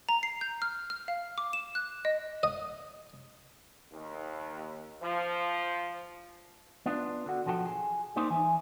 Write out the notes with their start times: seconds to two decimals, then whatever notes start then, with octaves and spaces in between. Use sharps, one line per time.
0.09 A#5
0.23 C7
0.41 G6
0.62 F6
0.90 F6
1.08 F5
1.38 D6
1.53 E7
1.75 F#6
2.05 D#5
2.43 D#5
3.90 D#2
5.01 F3
6.86 B3 D4 F4
7.26 D3 F#4
7.46 B1 F3 F#4 A4 C#5 G5
7.66 G#4
8.16 G3 A#3 D#4 G4 C5
8.30 E3 G#5